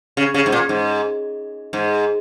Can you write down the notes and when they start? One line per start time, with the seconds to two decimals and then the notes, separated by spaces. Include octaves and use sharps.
0.17 C#3
0.34 C#3
0.46 G#2
0.52 A#2
0.69 G#2
1.73 G#2